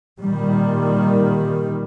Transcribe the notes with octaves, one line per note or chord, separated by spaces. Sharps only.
A#2 D#3 G3